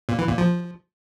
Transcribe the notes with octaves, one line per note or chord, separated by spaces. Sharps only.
A#2
E3
A#2
F3